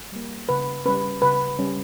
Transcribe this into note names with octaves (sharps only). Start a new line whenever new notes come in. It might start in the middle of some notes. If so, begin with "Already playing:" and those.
G3 A#3
C#3 B4
G3 C#4 B4
C#3 B4
G3 C#4